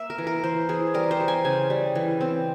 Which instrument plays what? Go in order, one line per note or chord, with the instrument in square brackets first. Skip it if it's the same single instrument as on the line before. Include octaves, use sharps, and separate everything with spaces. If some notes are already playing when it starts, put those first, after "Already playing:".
Already playing: [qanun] A#3 E5
A#4
E3
A#4
E3 C5
E3 G#4
G3 A#4
C5
G3
G#5
C#3 G#5
G3
E3
C4